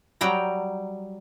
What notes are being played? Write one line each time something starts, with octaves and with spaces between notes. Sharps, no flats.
F#3 G3 G5 A#5